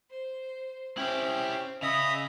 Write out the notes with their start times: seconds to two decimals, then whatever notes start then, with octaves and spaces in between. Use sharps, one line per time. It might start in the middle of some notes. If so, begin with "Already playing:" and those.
0.10 C5
0.97 C4 C#4 E4 G4 G5
1.82 C#3 D#5 E5 B5 D#6